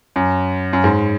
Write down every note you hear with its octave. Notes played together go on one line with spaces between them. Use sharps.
F#2
F#2
G#2